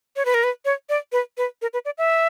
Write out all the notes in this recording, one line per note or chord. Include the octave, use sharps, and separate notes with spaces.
C#5
B4
A#4
B4
C#5
D5
B4
B4
A#4
B4
D5
E5